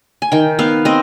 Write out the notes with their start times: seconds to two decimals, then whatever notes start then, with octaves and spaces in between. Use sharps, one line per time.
0.22 G#5
0.32 D#3 G5
0.59 B3 F5
0.85 C4 D#5